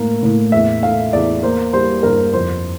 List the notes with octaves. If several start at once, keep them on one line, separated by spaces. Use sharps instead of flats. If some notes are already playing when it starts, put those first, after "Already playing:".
Already playing: A2 A#3
A2
E2 E5
A3 F5
E2 D5
A#3 C5
G3 C5
G2 A#4
F2 C5